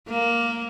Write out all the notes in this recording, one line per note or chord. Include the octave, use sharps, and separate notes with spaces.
A#3